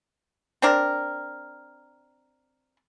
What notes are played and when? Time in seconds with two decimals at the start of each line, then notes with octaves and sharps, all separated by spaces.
0.62 C4 D4 A#4